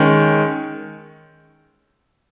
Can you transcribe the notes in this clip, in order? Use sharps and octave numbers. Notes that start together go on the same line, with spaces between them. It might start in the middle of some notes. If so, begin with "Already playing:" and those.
Already playing: D#3 G#3 C#4